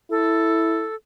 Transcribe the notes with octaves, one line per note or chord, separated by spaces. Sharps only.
E4 A4